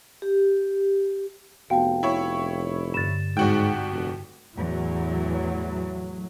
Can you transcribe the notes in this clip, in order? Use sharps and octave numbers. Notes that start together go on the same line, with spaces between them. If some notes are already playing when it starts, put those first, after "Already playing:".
G4
F1 B3 F#4 F5 G5 A5
E4 C#5
G2 D3 A6 E7
C2 G#2 F#4 G5
F1
E2 A2 F#3